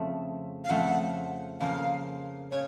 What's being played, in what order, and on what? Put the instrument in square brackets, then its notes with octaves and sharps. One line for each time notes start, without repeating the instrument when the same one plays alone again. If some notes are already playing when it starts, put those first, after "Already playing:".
Already playing: [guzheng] F2 C#3 F3 A3 C4
[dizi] F5
[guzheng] F2 C#3 F3 A3 C4 [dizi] F#5
[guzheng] F2 C#3 F3 A#3 [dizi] F5
[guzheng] C#3 [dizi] C#5